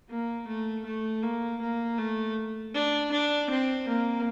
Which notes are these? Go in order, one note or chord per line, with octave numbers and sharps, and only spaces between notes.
A#3
A3
A3
A#3
A#3
A3
D4
D4
C4
A#3